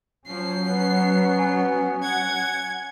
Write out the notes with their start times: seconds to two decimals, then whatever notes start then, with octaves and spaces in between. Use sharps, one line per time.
0.27 F3 F#3 C#4 C7
0.68 B3
1.39 G#5
2.03 F#5 G#6